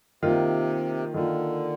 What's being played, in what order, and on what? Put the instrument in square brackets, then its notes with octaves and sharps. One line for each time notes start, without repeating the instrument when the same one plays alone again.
[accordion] C3 [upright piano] D#3 A#3 F4
[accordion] D3 [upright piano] D#3 A#3 F4